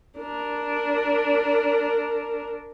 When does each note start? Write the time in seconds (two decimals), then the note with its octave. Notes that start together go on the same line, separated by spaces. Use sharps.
0.19 D4 A#4